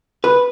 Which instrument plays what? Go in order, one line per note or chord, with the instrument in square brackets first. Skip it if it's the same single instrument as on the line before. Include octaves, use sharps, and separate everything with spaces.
[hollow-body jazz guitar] B4